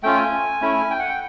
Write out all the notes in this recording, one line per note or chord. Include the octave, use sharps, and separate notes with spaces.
A3 C#4 F4 G5
G#5
A3 C#4 E4
G5
F#5
G5